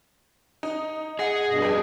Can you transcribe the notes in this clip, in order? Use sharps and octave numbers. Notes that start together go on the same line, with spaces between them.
D#4
G#4 D#5 F#5
G2 B2 D#5
F2 G4